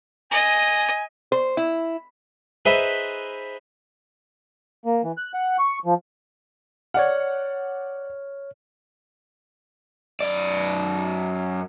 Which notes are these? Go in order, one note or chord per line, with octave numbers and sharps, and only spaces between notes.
D#5 G#5
C5
E4
D#4 G#4 B4 C5 E5
A#3
E3
F#6
F#5
C#6
F3
C#5 D5 F#5 F6
F#2 D5